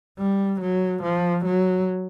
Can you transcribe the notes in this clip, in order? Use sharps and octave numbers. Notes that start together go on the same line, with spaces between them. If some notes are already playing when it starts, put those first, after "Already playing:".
G3
F#3
F3
F#3